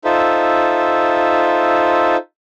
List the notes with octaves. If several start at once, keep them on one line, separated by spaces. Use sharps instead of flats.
D#4 F4 A4 C5 E5